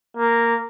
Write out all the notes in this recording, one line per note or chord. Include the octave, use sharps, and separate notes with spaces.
A#3